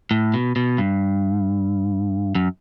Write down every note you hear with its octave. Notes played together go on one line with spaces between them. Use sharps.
A2
B2
B2
G2
F#2